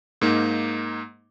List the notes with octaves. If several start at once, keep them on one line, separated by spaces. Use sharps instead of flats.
G#2 A#3 D#4